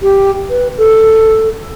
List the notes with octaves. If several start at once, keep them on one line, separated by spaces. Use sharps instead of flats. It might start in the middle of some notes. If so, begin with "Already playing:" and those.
G4
B4
A4